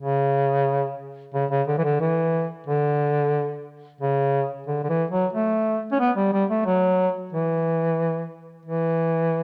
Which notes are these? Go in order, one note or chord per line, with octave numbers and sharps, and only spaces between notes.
C#3
C#3
C#3
D3
E3
D3
E3
D3
C#3
D3
D3
E3
F#3
A3
C#4
B3
G3
G3
A3
F#3
E3
E3